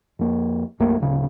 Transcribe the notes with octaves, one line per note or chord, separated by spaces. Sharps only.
F2 A#3
B1 F#2 A3 A#3
D1 C#3